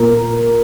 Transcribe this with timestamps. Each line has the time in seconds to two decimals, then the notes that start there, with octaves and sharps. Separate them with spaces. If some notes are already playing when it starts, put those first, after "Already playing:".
Already playing: A#2 A#3 F4 A#4